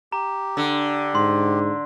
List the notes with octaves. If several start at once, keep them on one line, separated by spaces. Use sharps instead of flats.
G4 A#5
D3
G#2 C6